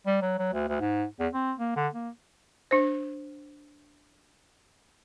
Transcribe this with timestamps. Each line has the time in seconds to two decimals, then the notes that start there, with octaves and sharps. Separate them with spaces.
0.07 G3
0.22 F#3
0.39 F#3
0.53 D2
0.68 D2
0.81 G#2
1.20 E2
1.33 C4
1.58 A#3
1.76 D3
1.94 A#3
2.71 D4 C5